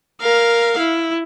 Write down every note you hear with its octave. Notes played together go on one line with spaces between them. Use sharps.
A#4 F5
E4